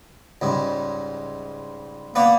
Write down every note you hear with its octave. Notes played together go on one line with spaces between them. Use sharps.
C#2 G#2 G3
A#3 B3 B4 D5